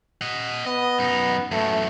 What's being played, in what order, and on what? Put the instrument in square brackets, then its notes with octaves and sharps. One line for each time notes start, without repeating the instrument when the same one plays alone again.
[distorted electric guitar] D#5 F#5
[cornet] B3 [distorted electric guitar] D#5
[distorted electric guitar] F#2 D#4
[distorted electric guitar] F#2 A2 [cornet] A3